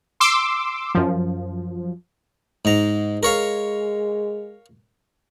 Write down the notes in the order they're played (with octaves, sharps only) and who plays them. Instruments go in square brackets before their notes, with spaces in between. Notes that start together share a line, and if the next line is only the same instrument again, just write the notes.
[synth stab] C6 D6 E6
F#2 F3
[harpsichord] G#2 A#5
[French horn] G#3 [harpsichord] A#4 C#5 F5